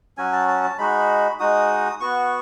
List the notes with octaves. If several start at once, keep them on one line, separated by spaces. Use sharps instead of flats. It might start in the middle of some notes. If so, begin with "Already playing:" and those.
F#3 C#4 F#4 G#5
A5
A5
A5
G#3 D#4 F#4 B5
G#3 D#4 F#4 D#6
B3 F#4 C#6